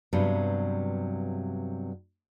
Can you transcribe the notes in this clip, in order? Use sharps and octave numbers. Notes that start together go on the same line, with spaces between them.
G2 C3 F#3 B3